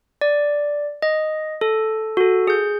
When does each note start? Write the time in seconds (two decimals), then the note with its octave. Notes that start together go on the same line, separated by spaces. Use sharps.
0.21 D5
1.02 D#5
1.61 A4
2.17 F#4 A4
2.47 G#4 G6